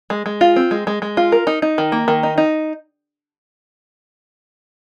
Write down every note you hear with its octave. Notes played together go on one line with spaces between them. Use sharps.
G#3
G#3
F4
C4
G#3
G#3
G#3
F4
A#4
D#4
D#4
D#3
A#3
D#3
D#4
D#4